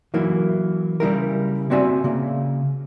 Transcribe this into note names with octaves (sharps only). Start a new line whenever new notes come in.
E3 F#3 A#3 E4
C#3 G3 E4 A#4
A#3 C4 F#4 D5 E5 G#5
C#3 A#3